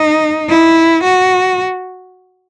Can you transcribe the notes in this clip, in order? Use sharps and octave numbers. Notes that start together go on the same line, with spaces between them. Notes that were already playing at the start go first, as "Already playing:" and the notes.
Already playing: D#4
E4
F#4